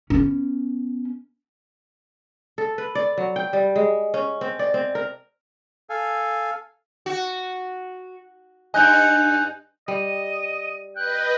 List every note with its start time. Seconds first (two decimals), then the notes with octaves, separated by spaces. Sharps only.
0.10 B3 C#4
2.58 A4
2.78 B4
2.95 D5
3.18 F#3
3.36 G5
3.53 G3
3.76 G#3
4.14 C#4
4.41 C4
4.59 D5
4.74 C4
4.95 A#4
5.90 A4 F5 G#5
7.06 F#4
8.74 G2 D#4 D#5 G#5 F#6 G6
9.88 G3 D#5 D#7
10.96 B4 D#5 G5 F#6